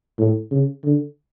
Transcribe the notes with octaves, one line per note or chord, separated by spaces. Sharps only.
A2
C#3
D3